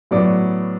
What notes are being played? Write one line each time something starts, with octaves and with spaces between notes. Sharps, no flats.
A2 F#3 B3 D5